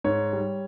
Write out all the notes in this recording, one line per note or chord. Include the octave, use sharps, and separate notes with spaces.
G#2 C#5
G3